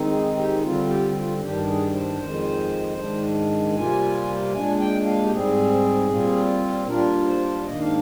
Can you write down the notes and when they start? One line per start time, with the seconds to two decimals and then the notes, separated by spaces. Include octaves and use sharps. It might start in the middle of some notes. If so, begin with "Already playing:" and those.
Already playing: D#3 G#3 C4 D#4
0.11 G#4
0.37 G4
0.63 D3 G3 C4 F4
0.89 G4
1.11 G4
1.16 F4
1.41 G2 D#3 G3 D4 G4
1.67 G#4
1.94 C5
2.19 F2 D#3 G#3
2.97 G#2 D#3 G#3 D4
3.75 C3 G3 A#3 F4 G#5
4.53 A#2 G#3 D4 G#5
4.80 G5
5.05 F5
5.23 G4
5.31 G#2 G3 C4 G#4
6.09 A#2 G3 C4 F4
6.87 A#2 G3 D4 F4 A#4
7.22 A#4
7.27 C5
7.66 G#2 D#3 A#3 D4 D#5
7.80 F5